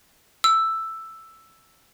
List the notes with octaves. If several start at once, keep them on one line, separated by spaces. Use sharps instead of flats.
E6